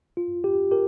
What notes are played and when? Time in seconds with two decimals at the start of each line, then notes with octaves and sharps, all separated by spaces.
0.17 F4
0.44 G4
0.71 G4 A#4